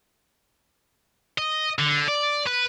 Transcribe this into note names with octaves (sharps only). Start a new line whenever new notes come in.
D#5
D3
D5
B4